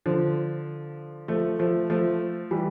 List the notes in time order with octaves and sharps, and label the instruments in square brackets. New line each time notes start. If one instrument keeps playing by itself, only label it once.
[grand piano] D3 F3
F3 A3
F3 A3
F3 A3
E3 G3